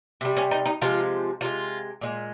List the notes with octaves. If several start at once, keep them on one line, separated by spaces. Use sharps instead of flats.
C3 G3
C#4
D#4
D#4
C3 F3 G#3 F4
C3 F3 G#3 F4
A#2 G#3